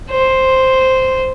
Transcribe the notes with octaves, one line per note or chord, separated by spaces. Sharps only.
C5